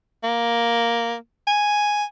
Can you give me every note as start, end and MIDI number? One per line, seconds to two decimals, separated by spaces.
0.24 1.14 58
1.48 2.04 80